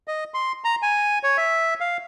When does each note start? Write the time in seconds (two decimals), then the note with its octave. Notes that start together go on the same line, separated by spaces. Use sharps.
0.08 D#5
0.34 C6
0.64 A#5
0.82 G#5
1.23 C#5
1.38 E5
1.80 F5